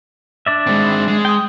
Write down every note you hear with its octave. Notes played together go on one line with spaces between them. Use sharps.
D4 D5 E5
G#3 C4
G#3
G5 D#6